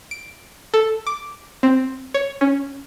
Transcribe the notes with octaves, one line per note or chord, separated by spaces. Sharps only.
D7
A4
D6
C4
C#5
C#4